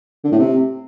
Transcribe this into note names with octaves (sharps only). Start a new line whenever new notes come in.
D3
A2
C3